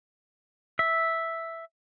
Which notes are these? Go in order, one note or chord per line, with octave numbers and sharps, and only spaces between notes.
E5